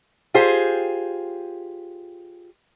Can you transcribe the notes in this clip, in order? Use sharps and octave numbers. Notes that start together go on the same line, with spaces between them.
F4 G4 G#4 C5